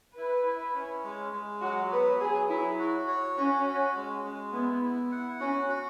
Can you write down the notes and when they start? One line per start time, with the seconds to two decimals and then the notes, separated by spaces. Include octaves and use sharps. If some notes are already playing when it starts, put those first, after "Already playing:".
0.17 E4 B4
0.46 E4
0.75 C#4
1.04 G#3
1.33 G#3
1.62 F#3 F#4
1.91 B3 B4
2.20 F#3 G#4
2.49 F#3 E4
2.79 F#4
3.08 C#5
3.37 C#4 F#4
3.66 F#4
3.96 G#3
4.24 G#3
4.53 B3 E4
4.83 E4
5.12 F#5
5.40 C#4 F#4
5.69 F#4